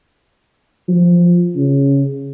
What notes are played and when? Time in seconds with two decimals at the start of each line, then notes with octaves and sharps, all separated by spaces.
0.88 F3
1.56 C#3